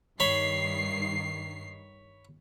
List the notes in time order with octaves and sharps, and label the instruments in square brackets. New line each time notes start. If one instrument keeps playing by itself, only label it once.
[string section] G2 D#3 C7 [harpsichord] C#5 B5